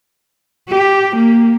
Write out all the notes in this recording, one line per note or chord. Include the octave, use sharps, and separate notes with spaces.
G4
A#3